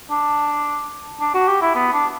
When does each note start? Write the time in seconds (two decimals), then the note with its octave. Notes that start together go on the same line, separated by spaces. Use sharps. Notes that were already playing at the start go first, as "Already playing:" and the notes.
0.11 D4
1.21 D4
1.34 F#4
1.48 G4
1.62 E4
1.75 B3
1.93 D4